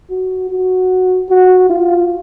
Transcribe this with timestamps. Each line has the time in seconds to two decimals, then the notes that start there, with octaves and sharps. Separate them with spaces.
0.10 F#4
0.50 F#4
1.29 F#4
1.69 F4